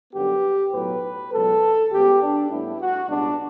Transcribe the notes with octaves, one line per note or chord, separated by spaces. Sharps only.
F#2 D3 G3 B3 G4
B1 A2 F#3 B3 B4
C#2 B2 F#3 B3 A4
C#2 C#3 G3 B3 G4
D4
A2 G3 B3 E4
F#4
C#2 B2 G3 B3 D4